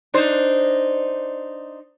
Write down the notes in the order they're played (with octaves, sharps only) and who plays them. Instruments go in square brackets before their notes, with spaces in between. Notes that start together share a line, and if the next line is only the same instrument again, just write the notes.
[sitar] D4 D#4 C5